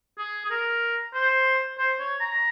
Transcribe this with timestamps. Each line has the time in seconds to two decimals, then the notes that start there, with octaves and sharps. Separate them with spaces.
0.18 G#4
0.45 G#4
0.51 A#4
1.14 C5
1.78 C5
1.99 C#5
2.21 A#5